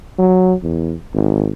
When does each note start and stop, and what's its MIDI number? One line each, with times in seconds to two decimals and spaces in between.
0.19 0.54 54
0.63 0.95 40
1.14 1.51 32